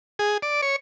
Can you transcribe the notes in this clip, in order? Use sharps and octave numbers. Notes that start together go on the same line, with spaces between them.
G#4
D5
C#5